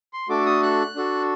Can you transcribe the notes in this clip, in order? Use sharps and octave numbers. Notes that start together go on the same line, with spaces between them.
C6
A3 D4 F#4 A4 D6
D#6
F#6
D4 F#4 A4